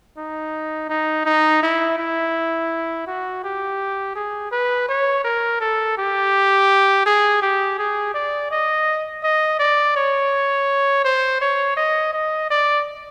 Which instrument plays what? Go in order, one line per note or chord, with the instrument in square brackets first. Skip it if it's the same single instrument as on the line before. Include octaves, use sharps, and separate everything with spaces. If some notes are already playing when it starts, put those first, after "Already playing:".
[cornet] D#4
D#4
D#4
E4
E4
F#4
G4
G#4
B4
C#5
A#4
A4
G4
G#4
G4
G#4
D5
D#5
D#5
D5
C#5
C5
C#5
D#5
D#5
D5